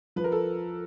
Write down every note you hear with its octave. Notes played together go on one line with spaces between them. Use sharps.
F3 B4
A#4
A4